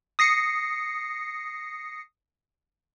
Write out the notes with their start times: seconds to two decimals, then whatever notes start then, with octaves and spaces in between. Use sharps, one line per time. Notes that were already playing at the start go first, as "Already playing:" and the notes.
0.19 D#6 A#6 C7 C#7